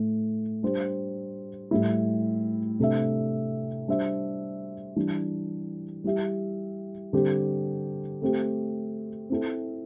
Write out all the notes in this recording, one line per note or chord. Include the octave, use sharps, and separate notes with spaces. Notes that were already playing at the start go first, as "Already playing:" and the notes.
Already playing: A2 A3
G3 D4 G4 C5
A2 G3 E4
C3 A3 D4 A4 E5
G3 D4 C5 E5
E3 G3 D4
G3 E4 G4 E5
D3 G3 C4 G4 C5
A3 C4 G4
C4 E4 A4